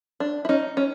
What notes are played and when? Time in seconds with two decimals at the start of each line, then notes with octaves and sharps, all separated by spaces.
0.20 D4
0.45 E4
0.49 C#4 D#4
0.77 C#4